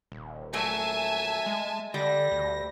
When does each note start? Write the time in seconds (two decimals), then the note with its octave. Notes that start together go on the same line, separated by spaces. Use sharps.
0.12 D#1
0.53 F#3 A3 E5 G#5 A5
1.46 G#3
1.94 D3 G3 A#6
2.32 D2